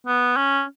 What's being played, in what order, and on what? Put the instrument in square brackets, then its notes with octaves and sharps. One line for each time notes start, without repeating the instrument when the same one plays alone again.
[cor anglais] B3
C#4